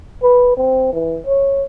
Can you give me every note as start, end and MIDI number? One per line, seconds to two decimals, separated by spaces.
0.22 0.53 71
0.57 0.88 60
0.93 1.19 52
1.26 1.64 73